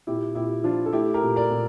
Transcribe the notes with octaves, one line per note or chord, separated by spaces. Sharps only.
A#2 E4 G4
A#2 E4 G4
F3 D4 F4
A4
A3 E4 G4
G4 A#4
A#2
A#4 D5
A#2